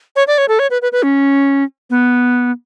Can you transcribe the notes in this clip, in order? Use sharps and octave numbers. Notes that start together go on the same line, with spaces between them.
C#5
D5
C#5
A4
C#5
B4
B4
B4
C#4
B3